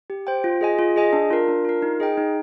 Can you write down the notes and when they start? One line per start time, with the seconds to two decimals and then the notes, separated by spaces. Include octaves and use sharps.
0.10 G4
0.27 C5 G5
0.44 F4
0.61 G#4 D#5 G#5
0.79 F4
0.96 G#4 D#5 G#5
1.13 D4
1.30 F4 A#4
1.48 D4
1.65 F4 A#4
1.82 D#4
2.00 G#4 D#5 G5
2.17 D#4